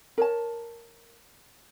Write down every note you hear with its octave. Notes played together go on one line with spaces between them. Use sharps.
A#4 C#5 A5